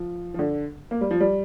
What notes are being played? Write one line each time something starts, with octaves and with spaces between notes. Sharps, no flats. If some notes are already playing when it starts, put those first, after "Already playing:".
Already playing: F3
F3
D3
A#3
G3
F3
G3